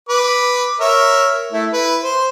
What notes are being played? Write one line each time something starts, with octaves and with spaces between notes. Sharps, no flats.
B4 D6
A#4 C#5 E5
A3 E4
E4 B4
C5